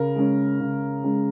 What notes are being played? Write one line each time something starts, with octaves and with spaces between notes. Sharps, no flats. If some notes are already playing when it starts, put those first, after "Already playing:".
Already playing: C#3 A#4
G#3 C#4
C#3
G#3 C#4